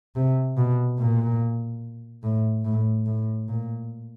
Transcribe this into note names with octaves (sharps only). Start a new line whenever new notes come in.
C3
B2
A#2
A2
A2
A2
A#2